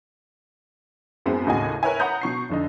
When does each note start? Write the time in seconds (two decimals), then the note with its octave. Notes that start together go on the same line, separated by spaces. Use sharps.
1.26 F#2 G#3 B3 C4 E4
1.46 D#2 A2 C#3 D#4 F#4 G#5
1.83 A#4 B4 C#5 E5 G#5
2.00 F#5 A#5 B5 D#6 G6
2.22 B2 C#6 C7
2.49 F1 D3 D#4